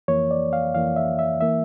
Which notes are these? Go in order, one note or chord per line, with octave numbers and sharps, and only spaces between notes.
F2 E3 A#3 C#5
D5
F5
F2 E3 A#3 F5
E5
E5
E3 A#3 E5